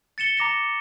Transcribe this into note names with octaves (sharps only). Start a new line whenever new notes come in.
A6 C#7 E7 G7
A#5 D6 A#6 E7